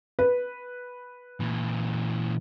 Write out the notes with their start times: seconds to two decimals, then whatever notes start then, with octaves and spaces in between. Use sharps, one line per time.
0.19 B4
1.40 A#2 E3